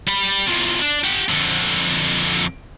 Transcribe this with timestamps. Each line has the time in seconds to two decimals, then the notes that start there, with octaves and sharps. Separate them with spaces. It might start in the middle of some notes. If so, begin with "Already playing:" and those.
0.08 G3 B5
0.47 E2 F3
0.81 D4
1.04 G4 F#5
1.29 F2 D3